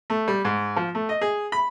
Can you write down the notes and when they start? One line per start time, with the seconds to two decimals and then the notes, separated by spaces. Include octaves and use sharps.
0.10 A3
0.28 G3
0.45 G#2
0.76 F3
0.95 A3
1.09 D#5
1.21 G#4
1.52 B5